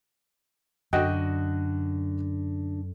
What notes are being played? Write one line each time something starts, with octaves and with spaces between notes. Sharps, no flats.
F#2 D3 F#4 D#5 G5